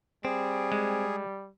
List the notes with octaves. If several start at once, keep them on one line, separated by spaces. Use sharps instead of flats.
G3 C4 G#4
G#3